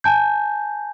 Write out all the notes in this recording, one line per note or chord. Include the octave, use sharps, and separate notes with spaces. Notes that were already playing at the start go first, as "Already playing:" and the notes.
G#5 A5 G6